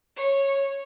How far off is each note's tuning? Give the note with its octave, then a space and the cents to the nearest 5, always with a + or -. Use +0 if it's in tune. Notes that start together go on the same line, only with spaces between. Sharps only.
C#5 -10